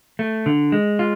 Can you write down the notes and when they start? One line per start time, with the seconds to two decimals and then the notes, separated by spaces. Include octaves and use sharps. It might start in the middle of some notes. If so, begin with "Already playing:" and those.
0.19 A3
0.46 D3
0.72 G#3
0.99 F4